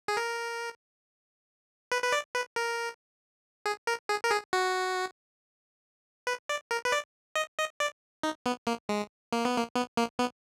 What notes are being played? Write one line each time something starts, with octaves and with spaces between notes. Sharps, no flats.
G#4
A#4
B4
B4
D5
B4
A#4
G#4
A#4
G#4
A#4
G#4
F#4
B4
D5
A#4
B4
D5
D#5
D#5
D5
D#4
B3
A#3
G#3
A#3
B3
A#3
B3
A#3
B3